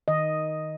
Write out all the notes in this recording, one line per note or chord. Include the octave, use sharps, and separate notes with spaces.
D#3 D#5